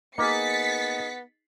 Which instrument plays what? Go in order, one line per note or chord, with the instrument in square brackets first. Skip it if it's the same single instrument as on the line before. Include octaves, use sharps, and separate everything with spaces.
[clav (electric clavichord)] A#3 [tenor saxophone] B3 [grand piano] D#4 G#4 [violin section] A6 B6 C#7